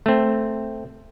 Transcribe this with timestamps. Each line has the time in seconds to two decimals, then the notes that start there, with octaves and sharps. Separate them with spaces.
0.06 A3 C4